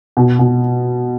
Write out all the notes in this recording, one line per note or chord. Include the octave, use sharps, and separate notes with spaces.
B2
B2